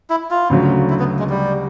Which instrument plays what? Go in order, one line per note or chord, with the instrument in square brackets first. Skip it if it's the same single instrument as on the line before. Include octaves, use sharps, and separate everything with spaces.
[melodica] E4
F4
[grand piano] D2 C#3 F#3
[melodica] E4
B3
G#3
G3